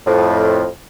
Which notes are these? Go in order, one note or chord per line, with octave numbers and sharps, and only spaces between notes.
F2 A2